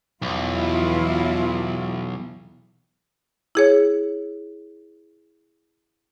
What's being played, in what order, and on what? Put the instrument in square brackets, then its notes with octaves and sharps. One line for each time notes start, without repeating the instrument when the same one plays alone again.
[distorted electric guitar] B1 [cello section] E2 E4 F4
[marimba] E4 G#4 C#5